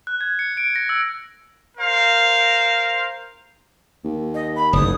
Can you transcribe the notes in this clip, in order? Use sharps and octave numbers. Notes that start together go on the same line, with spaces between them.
F#6
G#6
C#7
D7
A#6
E6
A#4 C5 F5
D#2
D#5
B5
F#1 E2 D#6